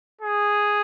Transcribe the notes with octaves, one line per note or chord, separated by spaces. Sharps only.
G#4